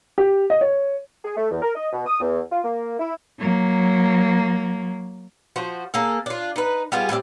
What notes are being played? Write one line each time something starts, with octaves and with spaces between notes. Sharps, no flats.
G4
D#5
C#5
G#4
A3
E2
A#4
D#5
B2
D#6
E2
F4
A#3
E4
F#3 A#3
F3 F#4 C5
A#3 G#4 A4
D4 F4
D#4 B4
G3 B3 F4 G#4
A2 G3 C4 D5